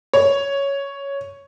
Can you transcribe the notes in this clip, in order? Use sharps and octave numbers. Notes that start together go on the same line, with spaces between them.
C#5